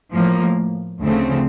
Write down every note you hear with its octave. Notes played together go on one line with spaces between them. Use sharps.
A2 F3 A#3
D2 C#3 F3 A3 C4